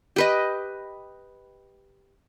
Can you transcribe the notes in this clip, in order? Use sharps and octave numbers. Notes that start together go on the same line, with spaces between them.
G4 B4 D#5